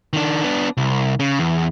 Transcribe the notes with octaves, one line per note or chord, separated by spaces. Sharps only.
D#3 D4
B3 D4
C2
C#3
E2